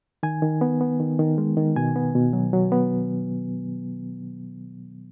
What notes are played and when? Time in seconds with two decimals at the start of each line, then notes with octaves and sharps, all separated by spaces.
0.23 D#3 G#5
0.42 D#3
0.61 B3
0.81 B3
1.00 D#3
1.19 D#3
1.38 G#3
1.57 D#3
1.76 B2 G#5
1.96 B3
2.15 B2
2.33 F#3
2.53 F#3
2.72 B3